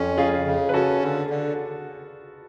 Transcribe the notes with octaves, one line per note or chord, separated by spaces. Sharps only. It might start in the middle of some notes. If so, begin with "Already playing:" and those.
Already playing: F2 C#4
C#3 F4 G#4
C#3
B4
C#4 F#4 A4
D3
D3